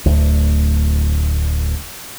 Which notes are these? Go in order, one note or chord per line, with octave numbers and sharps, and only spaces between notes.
D1 D2